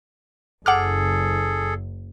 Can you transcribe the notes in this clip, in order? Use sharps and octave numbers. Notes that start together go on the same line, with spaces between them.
F#1 G#4 A4 F#5 D6 F6